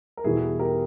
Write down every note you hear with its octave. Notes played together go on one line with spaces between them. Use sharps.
A#4
E2 B2 G3 E4 G#4
G4 A#4